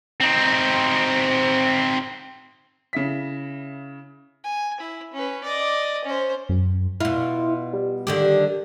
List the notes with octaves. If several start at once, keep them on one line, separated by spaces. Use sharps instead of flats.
C4 D#4
C#3 E4 B6
G#5
E4
C#4 B4
D5 D#5
C#4 C5
F#2
B2 E4 F4
G3
D3 D#3 G4